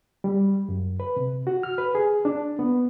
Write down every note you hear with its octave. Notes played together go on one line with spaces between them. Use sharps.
G3
F#2
B4
C3
F#4
F6
B4
G#4
D4
B3